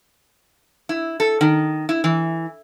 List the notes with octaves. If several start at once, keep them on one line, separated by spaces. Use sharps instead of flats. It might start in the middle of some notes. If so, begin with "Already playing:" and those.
E4
A4
D#3
E4
E3